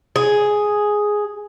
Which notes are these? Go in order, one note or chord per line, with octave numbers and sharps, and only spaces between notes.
G#4